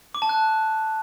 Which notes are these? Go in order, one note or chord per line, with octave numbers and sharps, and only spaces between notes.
D6
A5
F#6